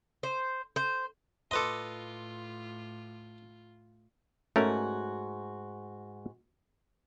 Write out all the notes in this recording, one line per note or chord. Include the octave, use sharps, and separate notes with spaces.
C5
C5
A2 F4 A4 B4 D#5 C6 D6
G#2 A3 C#4 F#4 A#4